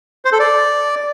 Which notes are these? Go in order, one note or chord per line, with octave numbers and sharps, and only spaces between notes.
C5
A4
D5